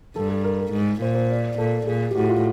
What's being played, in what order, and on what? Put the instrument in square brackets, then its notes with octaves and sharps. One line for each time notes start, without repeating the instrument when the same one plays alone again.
[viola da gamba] G2 [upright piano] A4
[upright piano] A4
A#4
A#4
[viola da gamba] G#2
[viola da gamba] A#2 [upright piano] C5
[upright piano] C5
D5
[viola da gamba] A#2 [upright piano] A4
[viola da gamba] A#2 [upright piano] G#4
[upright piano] G4
[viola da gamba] A2 [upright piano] F#4
[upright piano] F4